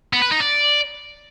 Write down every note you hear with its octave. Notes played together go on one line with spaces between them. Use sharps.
B3
B4
D#4
D5